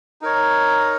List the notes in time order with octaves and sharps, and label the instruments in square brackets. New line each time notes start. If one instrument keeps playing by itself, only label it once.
[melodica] D#4 A#4 C#5